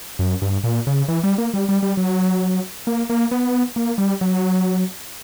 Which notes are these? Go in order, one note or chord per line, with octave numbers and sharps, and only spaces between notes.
F#2
G2
A#2
C#3
E3
G3
A#3
G3
G3
G3
F#3
A#3
A#3
B3
A#3
G3
F#3